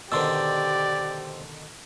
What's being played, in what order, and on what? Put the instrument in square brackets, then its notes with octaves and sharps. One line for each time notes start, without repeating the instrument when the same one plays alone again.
[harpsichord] B2 D3 D#3 [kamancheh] G4 [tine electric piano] C5 C6 E6 [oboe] D5